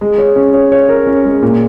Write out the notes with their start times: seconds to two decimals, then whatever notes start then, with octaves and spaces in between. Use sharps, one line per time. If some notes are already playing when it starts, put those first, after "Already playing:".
0.01 G#3
0.18 C#5
0.36 C#4
0.54 C#5
0.72 C#5
0.89 A#4
1.07 C#4
1.25 G#3
1.42 A#2